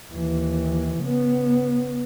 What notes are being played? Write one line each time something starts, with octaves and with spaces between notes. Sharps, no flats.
D#2 E3
C#3 B3